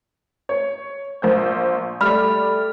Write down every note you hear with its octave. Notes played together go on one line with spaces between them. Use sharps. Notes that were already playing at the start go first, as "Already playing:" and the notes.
C#5
A#1 C5 G6
G3 A3 D5 B5 F6